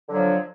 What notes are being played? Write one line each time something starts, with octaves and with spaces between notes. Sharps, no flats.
D3 F3 F#3